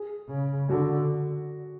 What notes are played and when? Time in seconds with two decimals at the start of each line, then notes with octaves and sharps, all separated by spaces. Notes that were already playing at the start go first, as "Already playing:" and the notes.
Already playing: G#4
0.29 C#3
0.69 D3 F#4